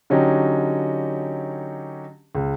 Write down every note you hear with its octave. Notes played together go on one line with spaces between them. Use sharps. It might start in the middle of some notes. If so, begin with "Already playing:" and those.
D3 F#3 C#4 D#4 G4
C#2